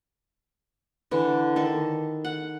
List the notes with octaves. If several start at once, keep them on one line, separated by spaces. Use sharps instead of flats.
D3 E3
D#3 A4
F#5